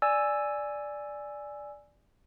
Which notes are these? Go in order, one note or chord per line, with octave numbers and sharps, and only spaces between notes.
D5 G#5 E6